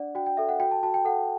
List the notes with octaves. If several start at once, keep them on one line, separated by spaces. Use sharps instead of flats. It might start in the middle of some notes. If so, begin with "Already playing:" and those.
Already playing: D4 D5 F#5
F#4 G5
G5
A4 E5
F#5
F#4 G5
A5
F#4 A5
G5
A4 F#5